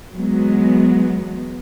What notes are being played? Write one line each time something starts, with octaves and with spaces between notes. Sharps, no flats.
E3 F#3 G#3 B3